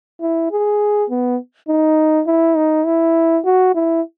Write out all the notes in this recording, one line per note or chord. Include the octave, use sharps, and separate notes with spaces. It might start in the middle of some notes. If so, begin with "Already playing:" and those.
E4
G#4
B3
D#4
E4
D#4
E4
F#4
E4